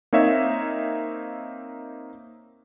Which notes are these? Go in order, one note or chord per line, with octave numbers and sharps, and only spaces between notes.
A#3 C4 D#4 C#5 E5 F5